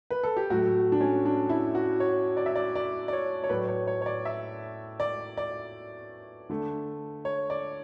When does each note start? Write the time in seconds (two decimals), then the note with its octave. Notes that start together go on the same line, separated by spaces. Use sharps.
0.10 B4
0.23 A4
0.36 G4
0.50 A2 F#3 A3 F#4
0.92 D4
1.01 C#4
1.25 D4
1.49 E4
1.75 F#4
2.00 C#5
2.37 D5
2.46 E5
2.56 D5
2.75 D5
3.08 D5
3.13 C#5
3.44 C#5
3.49 A2 F#3 A3 B4
3.68 C#5
3.87 C#5
4.02 C#5
4.06 D5
4.25 E5
5.00 D5
5.37 D5
6.49 D3 A3
7.25 C#5
7.50 D5